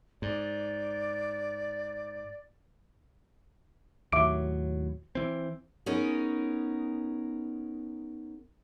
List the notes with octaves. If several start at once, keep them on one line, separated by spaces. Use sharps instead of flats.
G#2 D5
D#2 A2 F#3 E5 D6 D7
E3 C4
B3 C#4 D#4 G#4 A#4